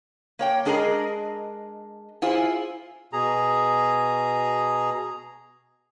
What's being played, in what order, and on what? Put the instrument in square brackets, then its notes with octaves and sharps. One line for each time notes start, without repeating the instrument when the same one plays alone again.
[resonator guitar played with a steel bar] A#3 C#5 G5
G#3 D4 G#4 A#4 D#5 A#5
E4 F4 G#4 C5
[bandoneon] B2 G#4 A#5